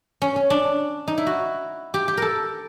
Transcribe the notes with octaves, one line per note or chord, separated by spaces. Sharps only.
C#4
C#4
D4
D#4
E4
F#4
G4
G4
A4 A#4